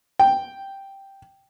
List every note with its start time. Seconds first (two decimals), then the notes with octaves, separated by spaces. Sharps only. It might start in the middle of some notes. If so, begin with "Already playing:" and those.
0.19 G5